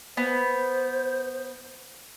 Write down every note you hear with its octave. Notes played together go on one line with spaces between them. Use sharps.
B3 C5